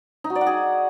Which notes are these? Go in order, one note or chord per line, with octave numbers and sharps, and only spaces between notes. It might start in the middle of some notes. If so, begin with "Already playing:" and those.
D#4
F#4
D5
F#5
G#4